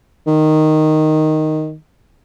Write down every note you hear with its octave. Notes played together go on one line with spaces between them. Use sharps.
D#3